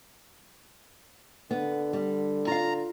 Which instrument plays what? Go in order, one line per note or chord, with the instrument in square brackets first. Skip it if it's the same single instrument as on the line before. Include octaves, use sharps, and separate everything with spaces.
[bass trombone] D3 [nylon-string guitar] B3
[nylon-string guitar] G3
[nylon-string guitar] F4 F5 [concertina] A#5